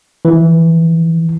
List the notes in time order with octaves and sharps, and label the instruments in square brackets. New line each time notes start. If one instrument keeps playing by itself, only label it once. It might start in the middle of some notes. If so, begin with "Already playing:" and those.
[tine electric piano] E3